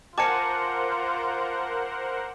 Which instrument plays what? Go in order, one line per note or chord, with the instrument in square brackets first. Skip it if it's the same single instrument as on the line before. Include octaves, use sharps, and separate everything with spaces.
[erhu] F4 [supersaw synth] A#4 C5 F#5 [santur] G#5 A5 [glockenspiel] D6 C#7